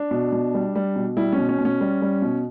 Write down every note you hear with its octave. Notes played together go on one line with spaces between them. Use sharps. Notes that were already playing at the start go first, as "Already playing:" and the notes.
Already playing: D4
B2
B2
G3
G3
B2
G3 E4
C#4
B2
C#4
B2
C#4
G3
G3
B2